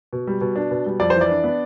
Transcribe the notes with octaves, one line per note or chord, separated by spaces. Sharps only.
B2
G3
B2
D4
B2
G3
F2 D5
C5
E3
D5
D4
B3